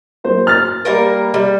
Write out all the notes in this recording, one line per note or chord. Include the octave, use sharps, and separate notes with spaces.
F#3 A#3 C5
F6 A6
G3 A#3 A#4
G3